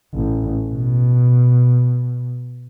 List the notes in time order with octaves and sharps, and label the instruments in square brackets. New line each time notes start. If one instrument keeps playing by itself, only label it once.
[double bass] A1
B2